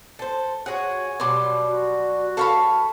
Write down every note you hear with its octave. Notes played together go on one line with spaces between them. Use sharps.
A4 C5
F#4 G#4 C#5 F#5
B2 F#3 G3 C6 D6
F#4
E3 A4 C#5 F5 A5 B5